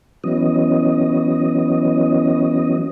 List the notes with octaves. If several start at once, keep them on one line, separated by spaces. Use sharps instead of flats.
E3 F#3 B3 C#4 D#5